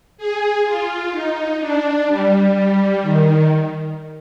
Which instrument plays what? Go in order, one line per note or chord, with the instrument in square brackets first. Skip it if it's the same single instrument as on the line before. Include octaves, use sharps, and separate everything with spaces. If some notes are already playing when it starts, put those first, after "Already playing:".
[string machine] G#4
F4
D#4
D4
G3
G3
D#3